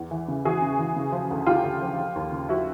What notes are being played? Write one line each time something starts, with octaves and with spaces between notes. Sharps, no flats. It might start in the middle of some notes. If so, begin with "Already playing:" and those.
Already playing: E2
E3
C#3
E3 F#4 G#4
C#3
E3
C#3
F3
D2
D2 F4 G4
D2
F3
F3
D#2
C#3
F3 E4 F#4